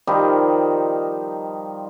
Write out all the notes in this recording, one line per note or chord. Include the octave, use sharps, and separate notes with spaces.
D#3 F3 G3 D#4